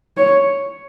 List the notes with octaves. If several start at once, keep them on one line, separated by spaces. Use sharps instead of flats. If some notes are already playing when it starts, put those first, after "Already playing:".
C#5